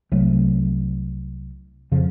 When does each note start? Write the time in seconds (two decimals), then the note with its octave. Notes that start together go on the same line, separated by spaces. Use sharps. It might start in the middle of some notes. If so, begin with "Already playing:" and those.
0.12 C2 F#3 A3
1.91 F2 C#3 F3